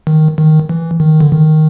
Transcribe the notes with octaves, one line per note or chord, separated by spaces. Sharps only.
D#3
D#3
E3
D#3
D3
D#3